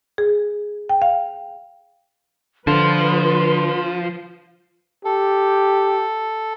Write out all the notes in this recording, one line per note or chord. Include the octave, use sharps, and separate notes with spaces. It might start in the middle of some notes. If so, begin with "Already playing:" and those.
G#4
G5
F5
D3 F3 B4 C6
G4 A4